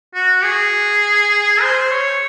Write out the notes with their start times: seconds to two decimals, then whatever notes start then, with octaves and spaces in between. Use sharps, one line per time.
0.14 F#4
0.44 G#4
1.61 C5
1.91 C#5